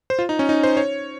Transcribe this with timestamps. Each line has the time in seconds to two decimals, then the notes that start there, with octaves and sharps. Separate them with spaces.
0.10 C5
0.19 F4
0.29 D#4
0.39 C#4
0.49 D#4
0.63 C5
0.77 C#5